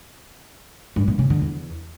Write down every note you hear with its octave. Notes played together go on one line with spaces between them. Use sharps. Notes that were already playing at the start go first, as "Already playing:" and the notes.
G2
A#2
C#3
D3
E2